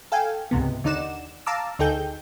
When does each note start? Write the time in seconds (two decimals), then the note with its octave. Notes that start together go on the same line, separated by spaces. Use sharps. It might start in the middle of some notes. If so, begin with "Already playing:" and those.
0.12 A4 F5 G5 G#5
0.51 C#2 G#2 C3 B3
0.84 D#2 D3 D#4 D5 F#5 E7
1.46 F5 A5 A#5 D6 E6
1.79 D2 D#4 G#4 A4 G5 G6